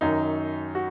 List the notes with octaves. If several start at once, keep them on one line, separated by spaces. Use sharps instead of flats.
F#2 D#3 F#3 D#4
F#4